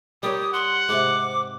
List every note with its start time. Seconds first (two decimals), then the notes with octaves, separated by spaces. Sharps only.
0.23 G3 G4 A#4 C#5 D#6
0.53 F#5 C6
0.89 G#2 C3 D6